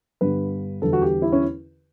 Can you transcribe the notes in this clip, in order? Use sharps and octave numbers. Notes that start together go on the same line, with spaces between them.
G2 D3 G3 B3 B4
E2 D3 G3 A4
F#4
G4
E4
C#4